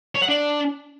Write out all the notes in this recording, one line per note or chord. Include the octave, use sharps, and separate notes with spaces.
C#5
F#5
D4